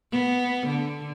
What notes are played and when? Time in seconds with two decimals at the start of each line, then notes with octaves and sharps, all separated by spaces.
0.12 B3
0.67 D3